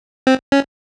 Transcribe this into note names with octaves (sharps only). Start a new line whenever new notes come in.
C4
C#4